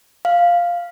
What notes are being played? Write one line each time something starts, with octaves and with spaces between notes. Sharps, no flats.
F5